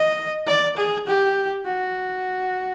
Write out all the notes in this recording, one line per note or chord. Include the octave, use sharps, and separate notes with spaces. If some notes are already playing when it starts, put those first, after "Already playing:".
Already playing: D#5
D5
G#4
G4
F#4